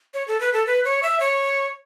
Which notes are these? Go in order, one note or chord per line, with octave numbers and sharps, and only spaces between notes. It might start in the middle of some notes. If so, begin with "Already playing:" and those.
C#5
A4
B4
A4
B4
C#5
E5
C#5